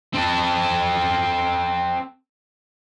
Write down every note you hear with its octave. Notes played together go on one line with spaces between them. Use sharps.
C4 A4